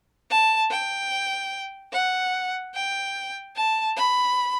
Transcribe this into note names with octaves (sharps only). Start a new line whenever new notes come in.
A5
G5
F#5
G5
A5
B5